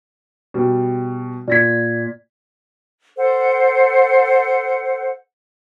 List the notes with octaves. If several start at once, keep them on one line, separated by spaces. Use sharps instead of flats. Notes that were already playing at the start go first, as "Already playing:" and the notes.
B2 G3
A#2 D5 G#6 A#6 B6
A4 C5 F#5